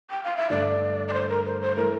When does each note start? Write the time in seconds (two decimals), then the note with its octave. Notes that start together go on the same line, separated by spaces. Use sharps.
0.10 G5
0.24 F5
0.37 E5
0.50 G2 D3 A3 D4 D5
1.08 D5
1.13 C5
1.29 A#4
1.45 C5
1.61 C5
1.76 E3 A3 A#4